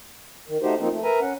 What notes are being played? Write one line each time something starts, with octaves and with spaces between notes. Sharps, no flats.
D#3
A3 D#4 F#4 G4 C5
F3 A#3 C4 D#4
A3
A#4 B4 E5 G#5 A#5
C#4 F#5